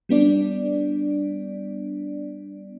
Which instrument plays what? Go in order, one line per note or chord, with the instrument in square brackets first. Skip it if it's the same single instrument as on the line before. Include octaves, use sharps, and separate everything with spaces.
[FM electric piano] G3 B3 D4 D5